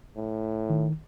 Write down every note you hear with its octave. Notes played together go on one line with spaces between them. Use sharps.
A2
D#3